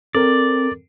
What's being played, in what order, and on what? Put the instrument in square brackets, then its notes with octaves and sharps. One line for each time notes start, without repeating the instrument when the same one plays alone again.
[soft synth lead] C4 [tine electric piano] A4 A#4 [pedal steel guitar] D5